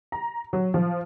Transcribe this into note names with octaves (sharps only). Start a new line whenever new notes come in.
A#5
F#3
F3